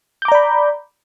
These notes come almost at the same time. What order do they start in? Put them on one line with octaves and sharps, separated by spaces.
G6 D6 A#5 D5 B5